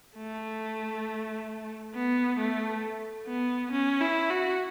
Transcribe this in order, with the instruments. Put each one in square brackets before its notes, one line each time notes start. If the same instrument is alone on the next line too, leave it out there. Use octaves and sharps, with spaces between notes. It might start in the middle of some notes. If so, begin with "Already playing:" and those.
[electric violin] A3
B3
A3
B3
C#4
E4
F#4